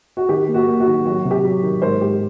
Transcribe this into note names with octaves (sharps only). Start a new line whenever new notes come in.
F#4
D#3 G4
A#3
F#4
A#3
F#4
D#3
F#3 F#4
C3
G4
F#3
D#3
G#2 A#4 C5
G#2 G4